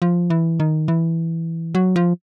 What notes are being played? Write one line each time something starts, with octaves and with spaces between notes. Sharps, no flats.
F3
E3
D#3
E3
F#3
F3